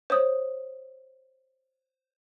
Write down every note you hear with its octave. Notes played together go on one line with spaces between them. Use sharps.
C5 C#5 D#6